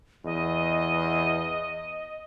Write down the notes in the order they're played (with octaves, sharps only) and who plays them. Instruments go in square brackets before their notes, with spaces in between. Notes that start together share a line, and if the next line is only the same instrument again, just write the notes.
[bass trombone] E2 [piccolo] D#5